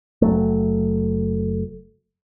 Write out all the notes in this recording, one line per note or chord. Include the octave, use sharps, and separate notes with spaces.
F#1 F#3 A3